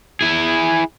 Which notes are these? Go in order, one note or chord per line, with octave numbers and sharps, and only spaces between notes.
E4 G#4